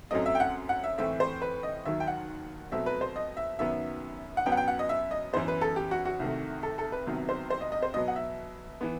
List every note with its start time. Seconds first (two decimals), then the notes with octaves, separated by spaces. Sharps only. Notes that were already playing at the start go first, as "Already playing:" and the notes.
0.11 F#2 F#3 A3 C4 D#5
0.26 E5
0.35 G5
0.40 F#5
0.69 F#5
0.84 E5
0.98 A2 E3 A3 C4 E5
1.20 C5
1.42 B4
1.63 D#5
1.85 D#2 D#3 F#3 E5
2.00 G5
2.07 F#5
2.72 B2 F#3 A3 C4 E5
2.86 B4
3.01 C5
3.16 D#5
3.37 E5
3.59 F#2 D#3 F#3 B3 E5
4.37 F#5
4.46 F#2 F#3 B3 G5
4.52 F#5
4.57 G5
4.68 F#5
4.79 D#5
4.89 E5
5.11 D#5
5.33 F#2 E3 B3 C5
5.48 B4
5.61 A4
5.76 G4
5.91 F#4
6.05 F#4
6.20 C2 C3 D#3 A3
6.63 A4
6.78 A4
6.92 B4
7.07 C2 C3 D#3 F#3 B3
7.29 C5
7.50 C5
7.61 D#5
7.72 D#5
7.83 C5
7.94 B2 F#3 B3 D#5
8.08 F#5
8.16 E5
8.81 E3 B3